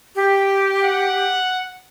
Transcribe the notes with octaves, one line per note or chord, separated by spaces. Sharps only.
G4
F#5